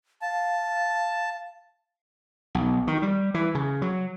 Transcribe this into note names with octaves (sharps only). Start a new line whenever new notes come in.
F5 A5
B1
D#3
G3
E3
C#3
F#3